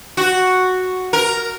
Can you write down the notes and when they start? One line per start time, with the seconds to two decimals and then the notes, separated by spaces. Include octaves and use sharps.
0.17 F#4
1.13 A#4